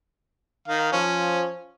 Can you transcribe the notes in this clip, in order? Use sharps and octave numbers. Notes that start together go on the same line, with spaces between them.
D#3 F5
F3 C#4